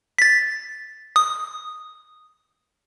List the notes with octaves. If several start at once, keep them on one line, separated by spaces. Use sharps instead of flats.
A6 B6
D#6